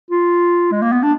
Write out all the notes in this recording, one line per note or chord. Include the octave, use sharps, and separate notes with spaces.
F4
G#3
A#3
B3
D4